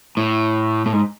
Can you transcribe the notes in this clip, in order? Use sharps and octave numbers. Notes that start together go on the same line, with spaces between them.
A2
A2
G#2